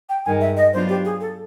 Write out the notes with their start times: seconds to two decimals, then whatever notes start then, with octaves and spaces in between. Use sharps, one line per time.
0.09 G5
0.25 G2 D#3 G#3 G#5
0.41 E5
0.57 D#5
0.73 F#3 B3 D4 F4 C5
0.89 G4
1.05 G#4
1.20 A4